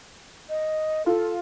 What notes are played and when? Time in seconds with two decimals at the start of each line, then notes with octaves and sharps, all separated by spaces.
0.49 D#5
1.06 F4 A4